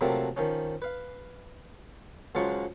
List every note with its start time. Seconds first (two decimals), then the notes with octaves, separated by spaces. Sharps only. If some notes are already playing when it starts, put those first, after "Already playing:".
0.01 C3 F3 F#3 A3 A#3 C4
0.37 D#3 F3 C#4
0.82 B4 F5
2.35 C#2 F3 F#3 G#3 F4 C#6